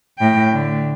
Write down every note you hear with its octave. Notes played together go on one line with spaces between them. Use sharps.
A2 G5
D3 A3